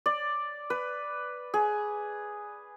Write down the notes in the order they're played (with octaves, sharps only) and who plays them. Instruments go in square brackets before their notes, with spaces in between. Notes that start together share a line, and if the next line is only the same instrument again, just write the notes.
[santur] D5
B4
G#4